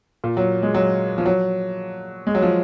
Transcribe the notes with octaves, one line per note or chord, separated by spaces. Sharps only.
A#2
F#3
G#3
F#3
F3
F#3
G#3
F#3
F3